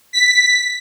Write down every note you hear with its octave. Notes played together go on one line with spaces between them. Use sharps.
B6